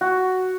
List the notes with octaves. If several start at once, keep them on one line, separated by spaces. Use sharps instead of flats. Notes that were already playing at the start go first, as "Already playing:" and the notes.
F#4